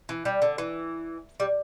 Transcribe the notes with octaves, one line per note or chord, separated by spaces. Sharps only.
E3
G3
D3
E3
G3